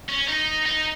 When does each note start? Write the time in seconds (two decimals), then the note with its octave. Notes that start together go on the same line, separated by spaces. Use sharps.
0.09 C#4
0.28 D#4
0.66 D#4